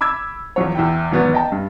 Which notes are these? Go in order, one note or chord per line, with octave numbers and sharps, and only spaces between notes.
B5 D6 E6 G#6
E2 F3 F#3 C#5
E2 E4 G5
G#1 E2 F#3 B3 F#4 A6
D#5 G5 A5
G2